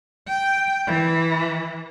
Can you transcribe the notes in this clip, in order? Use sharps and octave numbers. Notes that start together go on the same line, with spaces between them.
G5
E3